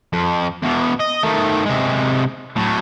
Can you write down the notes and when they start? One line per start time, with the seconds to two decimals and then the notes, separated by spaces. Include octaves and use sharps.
0.13 F2
0.63 E2 B2
1.00 D#5
1.23 D#3 A3
1.66 C3 G#3
2.56 A2 F#3